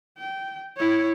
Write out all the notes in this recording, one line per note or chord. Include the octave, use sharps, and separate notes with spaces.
G5
E4 C#5